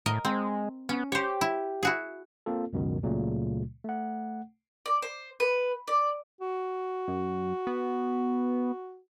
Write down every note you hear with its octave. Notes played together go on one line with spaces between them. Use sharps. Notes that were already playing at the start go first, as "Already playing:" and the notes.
A2 A#4 D#5
G#3 C4
B3 C#4
G4 C5 C#5
E4
E4 F#4 G#4
A#3 C4 F4 A4
C#2 F#2 B2 D#3
C#2 A#2 C#3 F#3 A3
A3 F#5
D5
C5
B4
D5
F#4
F#2
B3